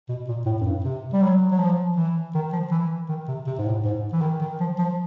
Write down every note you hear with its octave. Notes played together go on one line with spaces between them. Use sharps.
B2
A#2
A2
F#2
G2
C3
G3
F#3
F#3
F3
E3
D#3
F3
E3
D#3
C3
C3
G#2
A2
G#2
E3
D#3
D#3
F3
F3